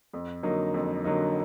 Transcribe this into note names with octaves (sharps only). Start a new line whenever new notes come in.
F2
D3 F#3 A#3 D#4
F2
D3 F#3 A#3 D#4